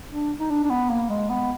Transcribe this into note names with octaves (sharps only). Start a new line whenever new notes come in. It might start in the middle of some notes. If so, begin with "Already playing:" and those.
D4
D#4
D4
D4
B3
A#3
G#3
B3